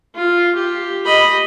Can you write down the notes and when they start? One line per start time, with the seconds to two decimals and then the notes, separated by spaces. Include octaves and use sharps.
0.15 F4
0.55 G4
1.05 D#5 B5